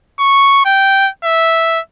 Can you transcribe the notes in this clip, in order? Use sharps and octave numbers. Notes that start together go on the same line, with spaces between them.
C#6
G5
E5